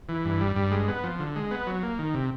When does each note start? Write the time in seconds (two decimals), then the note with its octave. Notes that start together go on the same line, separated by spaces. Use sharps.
0.09 E3
0.25 G2
0.41 G3
0.56 G2
0.71 G#3
0.88 B3
1.04 F3
1.19 D3
1.36 G#3
1.51 B3
1.67 F#3
1.83 A#3
1.99 D#3
2.14 C3